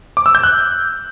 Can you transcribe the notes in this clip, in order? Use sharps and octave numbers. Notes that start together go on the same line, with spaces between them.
D6
E6
G6
F#6